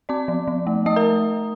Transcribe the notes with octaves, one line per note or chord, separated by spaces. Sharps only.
C4 D5 D6
F3
F3
A3
A3 D#5 D#6
A#4 A#5